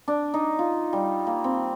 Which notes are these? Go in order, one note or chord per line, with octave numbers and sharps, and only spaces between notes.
D4
D#4
F4
G3
A#3
C4